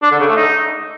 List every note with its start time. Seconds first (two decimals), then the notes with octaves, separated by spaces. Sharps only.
0.03 D4
0.11 D3
0.20 C#3
0.28 A3
0.36 D#4